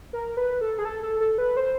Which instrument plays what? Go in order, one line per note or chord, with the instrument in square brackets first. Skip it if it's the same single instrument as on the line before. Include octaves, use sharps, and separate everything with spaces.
[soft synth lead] A#4
B4
A4
G#4
A4
A4
A4
B4
C5